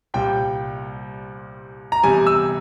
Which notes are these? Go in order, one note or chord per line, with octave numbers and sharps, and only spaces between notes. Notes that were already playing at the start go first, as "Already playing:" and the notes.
C2 A#2 G3 G5
A#5
E2 C3 G3 G#5
E6